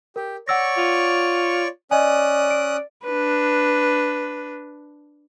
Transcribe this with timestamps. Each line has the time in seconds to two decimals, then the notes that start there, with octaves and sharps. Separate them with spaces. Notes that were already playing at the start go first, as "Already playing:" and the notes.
0.16 G4 A#4
0.48 C#5 D5 F#5 C#6 E6 A#6
0.77 F4
1.91 C#4 D5 D#5 G#5 D#6 F#6
2.51 D7
3.05 D4 B4